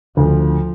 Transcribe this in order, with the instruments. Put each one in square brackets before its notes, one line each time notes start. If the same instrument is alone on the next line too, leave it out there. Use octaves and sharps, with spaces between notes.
[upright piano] D2 [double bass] F3